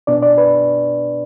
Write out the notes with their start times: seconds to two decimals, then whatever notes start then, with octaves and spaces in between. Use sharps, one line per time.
0.07 B2 B3 D4 D5
0.22 D5
0.38 B4